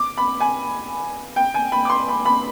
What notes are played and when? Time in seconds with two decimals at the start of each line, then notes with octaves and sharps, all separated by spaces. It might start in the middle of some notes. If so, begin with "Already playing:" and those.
Already playing: D6
0.18 B5
0.40 G#5
1.36 G5
1.54 G#5
1.72 B5
1.85 D6
1.89 C6
2.08 B5
2.26 B5